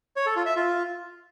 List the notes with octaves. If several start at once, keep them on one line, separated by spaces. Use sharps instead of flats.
C#5
A4
F4
E5
F4